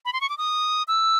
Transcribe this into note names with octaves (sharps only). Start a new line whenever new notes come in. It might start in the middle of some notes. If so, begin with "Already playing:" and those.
B5
C6
C#6
D6
D#6
E6